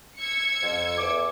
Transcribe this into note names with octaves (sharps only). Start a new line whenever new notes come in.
E6 G#6 C#7
F2
E2 D6